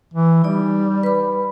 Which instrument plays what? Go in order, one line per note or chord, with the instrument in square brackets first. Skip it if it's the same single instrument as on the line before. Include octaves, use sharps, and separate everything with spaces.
[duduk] E3
[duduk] G3 [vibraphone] D#4 D5
[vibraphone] B4 B5